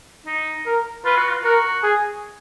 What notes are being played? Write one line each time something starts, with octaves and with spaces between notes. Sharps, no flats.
D#4
A#4
F4 B4
F#4
F4
F#4 A#4
G#4